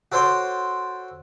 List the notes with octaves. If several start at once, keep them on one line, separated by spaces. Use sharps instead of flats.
F#4 A4 C5 C#5 C6 D6